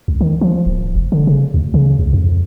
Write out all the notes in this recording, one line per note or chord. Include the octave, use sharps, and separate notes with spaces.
C#2
D#3
F3
D1
F1
D3
C#3
D2
C#3
C#2
F2